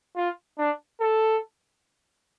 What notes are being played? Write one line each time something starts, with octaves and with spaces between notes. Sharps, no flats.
F4
D4
A4